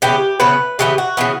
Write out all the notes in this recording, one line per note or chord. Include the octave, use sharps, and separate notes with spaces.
C#3 E3 B3 G4
C#3 E3 B3 B4
C#3 E3 B3 G4
F#4
C#3 E3 B3